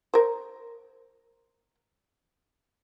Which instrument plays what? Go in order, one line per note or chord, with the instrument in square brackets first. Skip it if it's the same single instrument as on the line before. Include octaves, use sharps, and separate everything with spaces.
[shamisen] A#4 C5